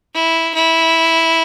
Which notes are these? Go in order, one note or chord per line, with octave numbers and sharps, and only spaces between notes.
E4
E4